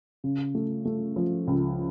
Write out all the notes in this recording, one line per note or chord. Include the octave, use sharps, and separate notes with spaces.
C#3
A3
A3
F3
C#2